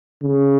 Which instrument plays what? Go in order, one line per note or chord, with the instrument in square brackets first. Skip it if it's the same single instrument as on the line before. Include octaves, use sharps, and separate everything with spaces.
[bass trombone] C#3